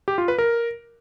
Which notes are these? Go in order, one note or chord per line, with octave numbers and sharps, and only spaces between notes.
G4
F4
B4
A#4